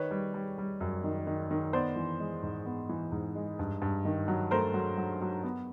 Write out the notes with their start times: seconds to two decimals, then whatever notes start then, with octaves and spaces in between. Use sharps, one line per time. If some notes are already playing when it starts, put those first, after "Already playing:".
Already playing: D#3 B4 C#5
0.11 G3
0.34 G3
0.58 G3
0.81 F#2
1.04 D#3
1.27 D#3
1.51 D#3
1.73 B3 C5 D5
1.96 E3
2.20 G#3
2.43 G#2
2.66 B3
2.89 E3
3.12 G#2
3.35 G#3
3.59 G2
3.82 G2
4.05 D#3
4.28 F#3
4.51 A3 A#4 C5
4.74 F#3
4.98 F#3
5.21 F#3
5.43 B3